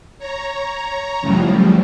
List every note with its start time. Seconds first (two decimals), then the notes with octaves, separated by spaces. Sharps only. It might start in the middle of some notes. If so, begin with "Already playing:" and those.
0.19 C#5 A#5
1.21 F#2 A2 C#3 E3 F3 G3